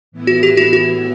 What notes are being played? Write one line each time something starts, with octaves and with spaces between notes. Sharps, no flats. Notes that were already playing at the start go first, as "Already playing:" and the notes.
A2 E3 B3 E4
F#4
G4
F#4
F#4